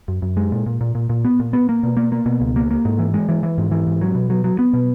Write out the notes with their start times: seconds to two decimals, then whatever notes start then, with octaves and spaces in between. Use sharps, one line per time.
0.08 F#2
0.22 F#2
0.37 G#3
0.52 A#2
0.66 A#2
0.81 A#2
0.95 A#2
1.10 A#2
1.25 B3
1.40 A#2
1.53 B3
1.69 A#3
1.83 B2
1.97 A#3
2.12 A#3
2.26 B2
2.41 C#2
2.56 A#3
2.71 A#3
2.85 G#2
2.99 E3
3.14 G#3
3.29 E3
3.43 E3
3.58 G#2
3.71 E3
3.87 G#2
4.01 F#3
4.15 B2
4.30 F#3
4.44 F#3
4.59 B3
4.73 B2